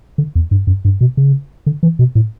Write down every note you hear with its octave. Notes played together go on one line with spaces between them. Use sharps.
D3
E2
G2
F#2
G2
B2
C#3
D3
E3
B2
A2